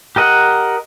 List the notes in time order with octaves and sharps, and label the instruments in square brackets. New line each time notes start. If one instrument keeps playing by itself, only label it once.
[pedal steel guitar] G4 A#4 D#5 F#5